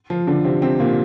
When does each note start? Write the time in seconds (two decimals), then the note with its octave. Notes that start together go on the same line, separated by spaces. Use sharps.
0.10 F3 F4
0.27 D3 D4
0.45 C3 C4
0.62 C3 C4
0.80 A#2 A#3